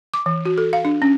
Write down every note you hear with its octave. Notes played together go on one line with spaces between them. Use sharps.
D6
E3
F#4
A4
F5
D4
C#4